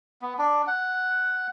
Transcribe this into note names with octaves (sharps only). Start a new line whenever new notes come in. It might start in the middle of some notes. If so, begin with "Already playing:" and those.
B3
D4
F#5